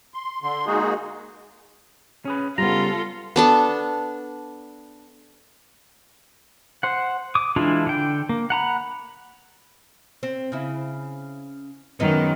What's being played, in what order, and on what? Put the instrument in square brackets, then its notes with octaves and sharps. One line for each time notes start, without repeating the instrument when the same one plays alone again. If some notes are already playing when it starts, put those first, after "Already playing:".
[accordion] C6
D3 C6
G#3 A#3 D#4 F#4 G#4
[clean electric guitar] C#4 G#4 B4
[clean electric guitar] C#3 A#5 [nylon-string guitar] G3 B3 [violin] F4 A4
[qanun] B3 D4 A4
[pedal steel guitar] C5 F#5
D6 D#6
E3 G#3 D4 E4 F4
D3 G5
A#3
F#5 A#5 B5
[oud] C4
C#3 E4
[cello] F#2 D#3 [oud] G#3 B3 D#4